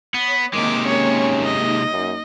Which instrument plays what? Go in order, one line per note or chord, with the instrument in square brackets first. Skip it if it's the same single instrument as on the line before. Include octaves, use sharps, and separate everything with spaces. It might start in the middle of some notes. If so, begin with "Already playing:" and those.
[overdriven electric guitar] B3 [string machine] C#5 D#6
[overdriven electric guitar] C3 G#3 [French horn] D#3 [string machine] A#3 D#4 [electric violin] D6
[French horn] C#4 [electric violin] C#5
[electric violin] D#5
[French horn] F#2